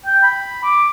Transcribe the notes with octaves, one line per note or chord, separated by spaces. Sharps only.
G5
B5
D6